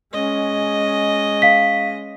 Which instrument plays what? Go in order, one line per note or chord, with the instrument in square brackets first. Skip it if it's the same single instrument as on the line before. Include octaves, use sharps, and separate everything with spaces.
[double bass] G#3 C#4 [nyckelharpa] D#5
[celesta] F5 B6